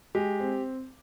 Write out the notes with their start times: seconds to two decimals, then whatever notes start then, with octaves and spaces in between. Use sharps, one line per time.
0.15 G#3 G4
0.40 C4